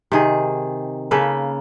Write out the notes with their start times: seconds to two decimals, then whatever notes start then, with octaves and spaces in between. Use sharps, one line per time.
0.12 C3 D#3 G#4
1.11 C#3 A#3 A4 B4